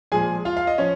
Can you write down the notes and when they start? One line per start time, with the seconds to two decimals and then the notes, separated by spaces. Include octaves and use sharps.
0.12 A#2 F3 G#3 G#4 G#5
0.45 F4 F5
0.57 F5
0.67 D#5
0.78 F3 C#4 C#5